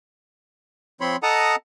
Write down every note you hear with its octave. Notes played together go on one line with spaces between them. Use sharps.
F3 C4 C#5 B5 C6
A4 D#5 F#5 A5 A#5 D#6